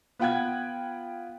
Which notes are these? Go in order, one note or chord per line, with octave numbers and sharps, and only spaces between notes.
B3 F4 F#5 G5 F#6 G#6